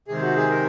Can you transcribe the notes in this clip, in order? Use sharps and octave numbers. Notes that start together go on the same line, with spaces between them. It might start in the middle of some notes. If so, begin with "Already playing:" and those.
C3 D#3 G#3 C4 G#4
F#4
G#4
A#4